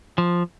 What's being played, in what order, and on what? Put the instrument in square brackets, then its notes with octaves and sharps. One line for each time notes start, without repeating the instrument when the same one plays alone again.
[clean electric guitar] F3